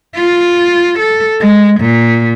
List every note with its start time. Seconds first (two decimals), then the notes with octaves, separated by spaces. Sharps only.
0.16 F4
0.99 A4
1.40 G#3
1.81 A#2